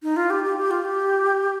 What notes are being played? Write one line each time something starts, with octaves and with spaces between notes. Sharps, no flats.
D#4
F4
G4
G4
G4
F4
G4